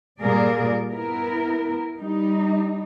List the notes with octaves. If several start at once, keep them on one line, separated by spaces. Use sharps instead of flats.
A#2 G3 A#3 G#4 A#4 D5
B3 E4 A#4
G3 D#4